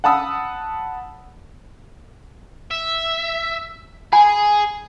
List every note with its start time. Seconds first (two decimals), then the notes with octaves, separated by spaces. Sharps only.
0.04 F#5 A5 B5 D#6 E6
2.71 E5
4.13 G#4 G#5 B5